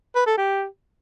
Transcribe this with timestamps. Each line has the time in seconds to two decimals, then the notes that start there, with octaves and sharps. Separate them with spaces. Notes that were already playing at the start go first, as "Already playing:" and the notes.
0.15 B4
0.26 A4
0.38 G4